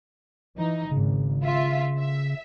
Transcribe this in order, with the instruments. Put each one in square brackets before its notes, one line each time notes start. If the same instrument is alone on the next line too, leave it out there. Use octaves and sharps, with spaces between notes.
[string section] E3 D#4
[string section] G#1 [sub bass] C#3
[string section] F4 E5
E5